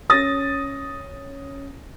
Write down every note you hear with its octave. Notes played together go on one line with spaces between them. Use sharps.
C#4 D#6 A6 A#6